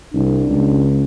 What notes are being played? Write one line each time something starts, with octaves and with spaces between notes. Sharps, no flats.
C2 D4
C#2